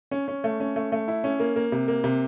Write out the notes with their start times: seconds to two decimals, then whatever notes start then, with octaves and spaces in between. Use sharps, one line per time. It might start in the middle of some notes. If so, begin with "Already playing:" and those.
0.11 C#4
0.28 C#4
0.44 A3
0.60 C#4
0.76 A3
0.92 A3
1.08 E4
1.24 C#4
1.40 A#3
1.56 A#3
1.72 C3
1.88 A#3
2.04 C3